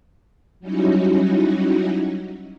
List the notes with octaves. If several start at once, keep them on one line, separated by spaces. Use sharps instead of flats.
F#3 G3 C#4 D#4 E4 F#4